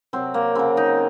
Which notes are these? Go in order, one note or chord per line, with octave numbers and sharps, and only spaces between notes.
C3 F#3 C4
A#3
C#3 F#3 C4
D#4